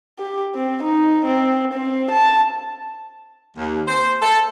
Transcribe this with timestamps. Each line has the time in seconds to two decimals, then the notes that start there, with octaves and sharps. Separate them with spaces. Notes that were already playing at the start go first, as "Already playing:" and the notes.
0.18 G4
0.55 C4
0.83 D#4
1.25 C4
1.73 C4
2.11 A5
3.57 D#2
3.88 C5
4.22 A4